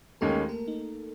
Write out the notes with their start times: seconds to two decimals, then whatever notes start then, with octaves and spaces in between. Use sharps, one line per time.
0.21 D#2 D#3 G#3 A3 C#4 A4
0.49 A#3 A#4
0.68 D#4